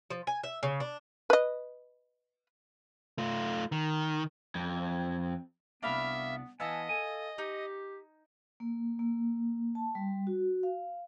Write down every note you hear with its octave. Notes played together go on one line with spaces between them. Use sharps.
F3
G#5
E5
C#3
D4
B4 D#5
A3 F4
D#3
F2
C2 A#3 B3 D4 E5 F5 B5
E3 B3 D#5 F5 G#5 A5 E6
A4 G#5
D#4 G4
A#3
A#3
A5
G3
F#4
F5